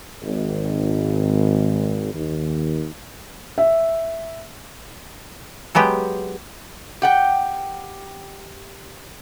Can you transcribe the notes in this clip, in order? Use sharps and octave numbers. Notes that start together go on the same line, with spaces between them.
G#1
D#2
E5
F#3 G#3 B3 G4
G4 F#5 G5